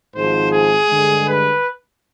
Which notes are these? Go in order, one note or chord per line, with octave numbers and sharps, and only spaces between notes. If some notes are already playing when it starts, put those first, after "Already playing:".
G#1 G#2 F3 G#3 C5
G#4
G2 D3 G#3
B4